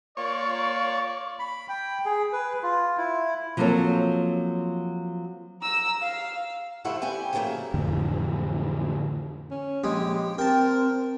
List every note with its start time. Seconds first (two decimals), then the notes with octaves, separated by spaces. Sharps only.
0.17 A#3 F4 C#5 D5
1.39 B5
1.69 G5
2.06 G#4
2.33 B4
2.63 F4
2.97 E4
3.57 F3 F#3 A#3 C4 A4 C#5
5.62 A#5 E6
6.02 F5
6.84 D2 G2 F3 A3 E4 F#5
7.02 G3 G4 G5 G#5
7.33 C#3 F3 F#3 A3 A#3
7.74 F2 A2 D3 E3
9.51 C#4
9.84 A#1 G#3 G4
10.38 C4 A#4 G5 A5